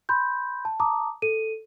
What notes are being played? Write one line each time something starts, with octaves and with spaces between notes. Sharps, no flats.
B5 C6 G6
A5
A5 A#5 D6 D#6
A4 D#7